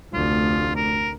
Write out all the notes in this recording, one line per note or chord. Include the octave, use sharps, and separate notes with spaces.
F1 D2 F4
A#4